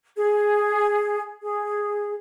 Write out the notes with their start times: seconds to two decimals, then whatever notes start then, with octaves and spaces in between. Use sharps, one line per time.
0.15 G#4
1.42 G#4